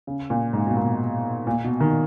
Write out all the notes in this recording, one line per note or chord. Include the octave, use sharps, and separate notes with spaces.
C#3
A#2
G#2
B2
A#2
A#2
B2
D#3